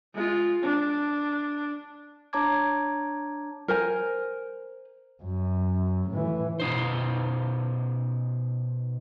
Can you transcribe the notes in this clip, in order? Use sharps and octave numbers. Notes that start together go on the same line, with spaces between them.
G#3 F4
D4
D4 C#5 A5 A#5 D6 G#6
A#4 C5 G#5
F#2
A2 E3
B2 D#4 C5